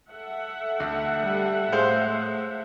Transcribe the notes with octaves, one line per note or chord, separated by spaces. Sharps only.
A4 E5 F#5
D2
G3
A2 G#3 C5 F5